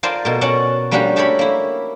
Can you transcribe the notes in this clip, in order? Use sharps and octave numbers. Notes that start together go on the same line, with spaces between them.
F4 A#4 C5 D5 G#5 A5
B2 A#4
C#4 F#4 C#5 D5 F#5 A5
G3 A#3 C#4 D4 F#4 G4
A3 G4 A4 A#4 C#5 B5
A#3 E4